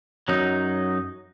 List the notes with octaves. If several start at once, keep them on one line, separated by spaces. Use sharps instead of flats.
F#2 F#3 D#4